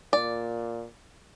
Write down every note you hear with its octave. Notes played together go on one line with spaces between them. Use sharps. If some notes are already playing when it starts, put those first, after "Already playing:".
A#2 D5